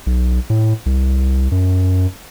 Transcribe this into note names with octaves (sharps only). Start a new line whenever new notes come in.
B1
A2
C2
F#2